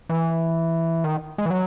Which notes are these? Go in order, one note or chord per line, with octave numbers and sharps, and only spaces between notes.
E3
D#3
G#3
E3
F#3